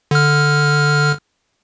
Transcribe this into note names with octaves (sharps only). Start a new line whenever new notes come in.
D3 F6